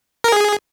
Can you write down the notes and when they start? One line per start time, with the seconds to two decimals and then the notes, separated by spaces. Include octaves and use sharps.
0.24 A#4
0.32 G#4